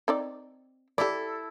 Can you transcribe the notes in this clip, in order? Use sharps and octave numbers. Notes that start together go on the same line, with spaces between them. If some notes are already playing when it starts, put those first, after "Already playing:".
C4 D#4 D5
E4 G4 A4 D5